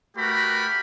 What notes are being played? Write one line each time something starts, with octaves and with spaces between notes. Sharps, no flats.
A3 F#4 G4 A#4 B4 B5